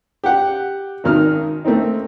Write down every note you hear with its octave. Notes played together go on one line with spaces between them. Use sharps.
G4 F#5
G#1 D#3 F6
A3 A#3 C4 D#4